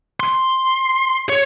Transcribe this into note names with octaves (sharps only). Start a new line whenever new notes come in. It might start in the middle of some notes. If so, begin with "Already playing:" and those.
C6
C#5